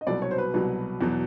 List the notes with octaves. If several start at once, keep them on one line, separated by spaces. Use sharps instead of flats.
D#5
C2 B2 F#3 D5
C#5
C5
B4
C2 B2 F#3
E2 B2 F#3